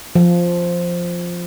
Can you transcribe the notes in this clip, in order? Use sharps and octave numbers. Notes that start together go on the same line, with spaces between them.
F3